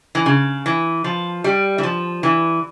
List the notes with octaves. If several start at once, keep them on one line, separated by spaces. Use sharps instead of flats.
E3
C#3
E3
F3
G3
E3
F3
E3